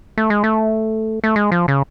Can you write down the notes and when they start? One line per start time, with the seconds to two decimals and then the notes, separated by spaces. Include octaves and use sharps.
0.18 A3
0.30 G#3
0.44 A3
1.24 A3
1.36 G#3
1.52 F3
1.68 C#3